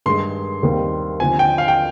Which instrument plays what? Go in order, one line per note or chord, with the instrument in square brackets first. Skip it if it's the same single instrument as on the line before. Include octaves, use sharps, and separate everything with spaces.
[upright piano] G2 D#3 G#3 [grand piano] C6
[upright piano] D#2 D#3 G3 C4 D#4
[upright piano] D#2 D3 F3 C4 [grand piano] G#5
[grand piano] G5
F5
G5